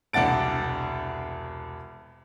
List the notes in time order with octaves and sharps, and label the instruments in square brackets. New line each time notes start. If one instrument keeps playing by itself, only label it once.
[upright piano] E1 C2 D4 F#5 A6 D7